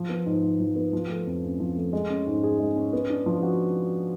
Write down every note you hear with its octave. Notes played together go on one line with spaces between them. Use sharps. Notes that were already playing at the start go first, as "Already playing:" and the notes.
Already playing: F3
B3
G#2
G#2
F3
B3
F3
A3
F2
C#4
F3
A3
G#3
C#4
G#2
G#4
G#3
C#4
B3
D4
F3
F#4